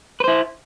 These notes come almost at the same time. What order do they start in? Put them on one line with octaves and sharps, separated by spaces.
B4 C5 E4